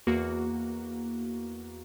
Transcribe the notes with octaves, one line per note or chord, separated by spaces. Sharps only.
E2 A#3 F#4